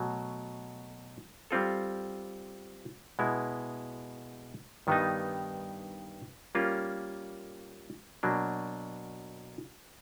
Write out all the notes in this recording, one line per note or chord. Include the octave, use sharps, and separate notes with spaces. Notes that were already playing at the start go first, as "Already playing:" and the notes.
Already playing: B2 F#3 A3
G3 C4 F4 A4
B2 G#3 B3 E4
G2 D#3 G3 B3 D#4
G3 A#3 C#4 F4 A#4
B2 F#3 A#3 D4